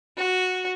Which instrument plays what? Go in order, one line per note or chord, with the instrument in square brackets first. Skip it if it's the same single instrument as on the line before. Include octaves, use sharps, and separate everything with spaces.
[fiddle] F#4